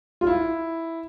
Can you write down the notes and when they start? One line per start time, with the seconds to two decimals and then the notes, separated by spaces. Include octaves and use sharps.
0.21 F4
0.27 E4